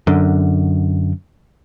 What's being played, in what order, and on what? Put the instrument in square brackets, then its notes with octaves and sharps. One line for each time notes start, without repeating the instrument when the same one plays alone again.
[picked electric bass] F#2 D3